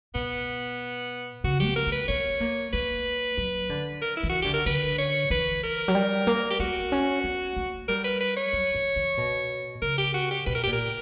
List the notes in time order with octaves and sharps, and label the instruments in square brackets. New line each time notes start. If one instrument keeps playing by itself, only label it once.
[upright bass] B2 [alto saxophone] B3
[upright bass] C#3 [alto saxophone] F#4
[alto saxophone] G4
[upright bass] B3
[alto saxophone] A#4
[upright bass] B3
[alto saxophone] B4
[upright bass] B3 [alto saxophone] C#5
[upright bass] A#3
[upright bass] A#3 [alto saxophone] B4
[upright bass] F#3
D3
[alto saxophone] A#4
E4
[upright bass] E3
[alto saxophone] F#4
[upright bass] D3 [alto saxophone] G4
[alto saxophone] A#4
[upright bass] D3 [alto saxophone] B4
[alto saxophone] C#5
[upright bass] E3 [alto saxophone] B4
[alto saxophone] A#4
[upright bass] F#3
G3
A#3
[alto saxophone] G4
[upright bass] B3 [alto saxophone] F#4
[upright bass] C#4
B3
A#3
[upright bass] G3 [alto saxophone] A#4
[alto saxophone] B4
B4
C#5
[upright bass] F#3
E3
E3
B2
[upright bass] C#3 [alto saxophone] A#4
[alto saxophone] G4
F#4
G4
[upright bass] B2 [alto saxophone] B4
[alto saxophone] A#4
[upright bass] A#2 [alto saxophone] G4
[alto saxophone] A#4